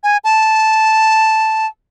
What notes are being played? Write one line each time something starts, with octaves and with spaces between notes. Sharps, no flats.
G#5
A5